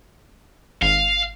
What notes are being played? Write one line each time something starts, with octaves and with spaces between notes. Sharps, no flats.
G#1 F5